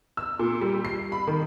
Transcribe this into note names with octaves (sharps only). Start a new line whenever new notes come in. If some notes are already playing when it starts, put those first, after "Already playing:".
E6
A#2
G3
C7
B5
D#3